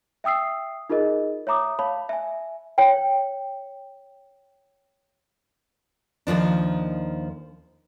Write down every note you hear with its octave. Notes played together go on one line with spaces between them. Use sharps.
E5 G5 D#6 E6 C7
D#4 F4 G#4 A#4 D#5
C#5 E5 A#5 D6 D#6
C#5 F5 A5 B5
E5 G#5
C#5 G5
D#2 D#3 F3 D4